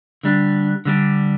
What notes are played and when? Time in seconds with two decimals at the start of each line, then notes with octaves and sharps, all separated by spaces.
0.23 D3 G3 D4
0.85 D3 G3 D4